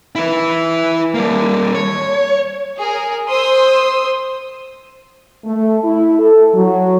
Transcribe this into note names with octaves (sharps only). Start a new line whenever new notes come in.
E4 B4
G3 A#3
C#5
G#4 A#4
C5 C6 D#6 E6
A3
E4
A4
F#3